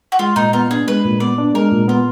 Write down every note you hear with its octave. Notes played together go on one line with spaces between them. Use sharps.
F#4
G#3 F4
A#2 D#4
B3 F4
D4 G#4
G#3 B4
A#2
B3 D5
D4
G#3 A#4
A#2
B3 F4